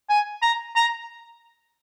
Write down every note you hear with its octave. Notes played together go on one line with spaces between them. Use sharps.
G#5
A#5
A#5